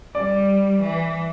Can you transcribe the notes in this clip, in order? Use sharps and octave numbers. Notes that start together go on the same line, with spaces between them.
G3 D5
E3